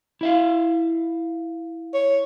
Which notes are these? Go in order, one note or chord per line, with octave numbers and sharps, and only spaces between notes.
E4 E5 F5
C#5